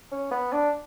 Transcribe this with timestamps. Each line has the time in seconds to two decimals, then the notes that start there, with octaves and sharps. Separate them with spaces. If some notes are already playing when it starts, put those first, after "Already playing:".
0.12 C#4
0.31 B3
0.52 D4